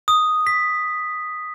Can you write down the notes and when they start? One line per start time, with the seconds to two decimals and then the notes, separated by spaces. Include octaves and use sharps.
0.08 D#6
0.47 B6